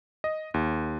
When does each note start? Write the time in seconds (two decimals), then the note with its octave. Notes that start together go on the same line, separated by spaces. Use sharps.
0.24 D#5
0.54 D#2